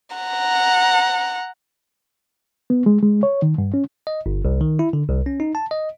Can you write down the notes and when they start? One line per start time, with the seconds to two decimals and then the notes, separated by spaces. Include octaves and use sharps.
0.16 F#5 A#5
2.70 B3
2.86 G#3
3.03 G#3
3.23 C#5
3.42 D#3
3.58 G2
3.74 C#4
4.07 D#5
4.26 G1
4.45 C2
4.61 D#3
4.79 E4
4.93 D3
5.08 C2
5.26 C#4
5.40 D#4
5.55 A5
5.71 D#5